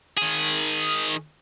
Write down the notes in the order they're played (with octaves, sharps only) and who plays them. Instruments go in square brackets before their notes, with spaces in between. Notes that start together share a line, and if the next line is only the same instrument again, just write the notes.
[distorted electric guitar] D#3 G#4